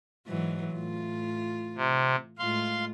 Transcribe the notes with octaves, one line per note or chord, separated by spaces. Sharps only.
G#2 E3 F#3
A2 F4
C3
A2 G#3 F4 F5 C6